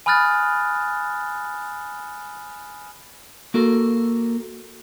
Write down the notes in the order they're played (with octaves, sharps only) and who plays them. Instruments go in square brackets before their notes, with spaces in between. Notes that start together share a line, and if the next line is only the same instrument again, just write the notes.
[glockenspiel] G#5 B5 D#6 F6 F#6 A6
[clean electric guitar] A#3 F#4 A4 A#4